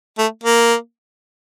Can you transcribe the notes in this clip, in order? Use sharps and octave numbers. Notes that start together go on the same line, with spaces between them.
A3
A#3